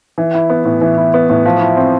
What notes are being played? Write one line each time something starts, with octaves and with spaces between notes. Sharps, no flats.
E3
E4
B3
A2
E3
E4
B3
A2
F3
E4
C4